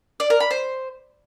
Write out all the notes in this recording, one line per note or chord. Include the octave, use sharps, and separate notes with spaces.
D5
A#4
B5
C5